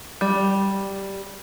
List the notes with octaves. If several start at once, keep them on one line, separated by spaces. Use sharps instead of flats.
G3